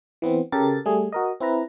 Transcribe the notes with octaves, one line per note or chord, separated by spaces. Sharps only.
E3 B3 C4
C#3 G4 A4 A#4 A6
G3 A3 G#4
F#4 A#4 D#5
C4 E4 B4 A#5